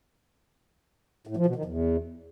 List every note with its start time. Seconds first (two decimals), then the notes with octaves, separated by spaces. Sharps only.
1.27 A2
1.37 F3
1.46 B2
1.56 D#3
1.65 E2